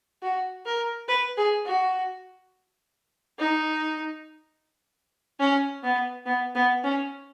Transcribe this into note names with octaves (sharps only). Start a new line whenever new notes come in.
F#4
A#4
B4
G#4
F#4
D#4
C#4
B3
B3
B3
C#4